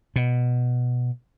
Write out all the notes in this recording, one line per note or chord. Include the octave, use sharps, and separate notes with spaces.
B2